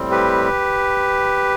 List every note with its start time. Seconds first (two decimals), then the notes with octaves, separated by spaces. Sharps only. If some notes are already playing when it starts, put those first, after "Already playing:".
Already playing: A2 G3 C4
0.11 G4 B4